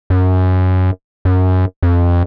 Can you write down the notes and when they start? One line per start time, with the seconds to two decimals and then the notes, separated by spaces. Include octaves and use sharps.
0.10 F#2
1.25 F#2
1.83 F2